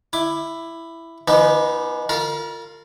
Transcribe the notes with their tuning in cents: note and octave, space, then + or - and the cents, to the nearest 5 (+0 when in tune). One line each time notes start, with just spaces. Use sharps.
E4 +5 D6 +15
E3 +40 B3 -20 D#4 -15
F4 +0 A#4 -35 A#5 +45